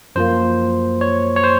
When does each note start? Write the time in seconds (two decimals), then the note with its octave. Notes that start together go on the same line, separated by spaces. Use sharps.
0.16 F#2 F3 A#3 C5
1.01 C#5
1.36 C#5
1.44 C5